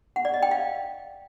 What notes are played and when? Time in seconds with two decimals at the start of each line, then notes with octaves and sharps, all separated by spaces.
0.16 F#5
0.25 D5
0.34 D#5
0.43 G5
0.51 F5